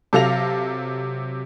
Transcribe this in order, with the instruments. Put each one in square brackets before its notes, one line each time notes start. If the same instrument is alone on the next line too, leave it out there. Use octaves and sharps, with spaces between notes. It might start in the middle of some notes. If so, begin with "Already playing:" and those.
[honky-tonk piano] C3 F#3 A4 F5 A#6 F7